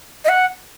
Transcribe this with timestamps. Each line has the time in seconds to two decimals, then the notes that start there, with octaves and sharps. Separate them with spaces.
0.25 D#5
0.29 F#5